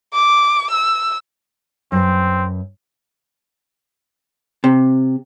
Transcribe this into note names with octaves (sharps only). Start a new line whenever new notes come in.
D6
E6
F#2 C4 B4
C3